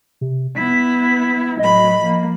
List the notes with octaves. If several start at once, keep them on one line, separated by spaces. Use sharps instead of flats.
C3
B3 E4 B6
A2 F#3 D#5 B5
F3 A#3